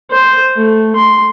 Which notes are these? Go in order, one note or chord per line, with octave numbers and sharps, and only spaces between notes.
C5
A3
C6